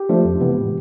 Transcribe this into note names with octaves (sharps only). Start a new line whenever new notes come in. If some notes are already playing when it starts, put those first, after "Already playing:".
Already playing: G4
F3 A3 D4
F2
C3 E3 G#3 B3
A2